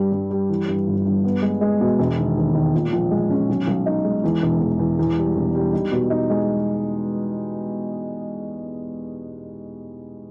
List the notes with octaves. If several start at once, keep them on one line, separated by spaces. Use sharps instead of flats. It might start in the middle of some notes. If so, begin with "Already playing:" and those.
Already playing: G2 G3
G2
G3
E3
G2
G1
G2
B3
G#3
G#3
B2
E1
D#3
D#2
D#3
A#2
A#1
G#3
C#4
B1
B1
D#4
G#3
E2
E1
E1
E2
E2
G3
E1
G3
D#4
B2
D#4
G#3